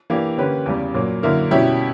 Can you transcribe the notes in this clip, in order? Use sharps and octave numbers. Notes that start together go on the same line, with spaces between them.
E3 A#3 D4 G4
D3 A#3 C#4 G4 B4
E2 C#3 G3
A#2 F#3 A#3
F#2 D3 A#3 E4 A#4
B2 G3 C#4 E4 G4